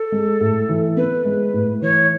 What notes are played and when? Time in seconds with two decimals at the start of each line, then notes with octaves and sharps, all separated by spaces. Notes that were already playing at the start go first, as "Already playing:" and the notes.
Already playing: A4
0.12 G#3
0.41 A2
0.69 E3
0.97 B3 B4
1.25 G#3
1.54 A2
1.82 E3 C#5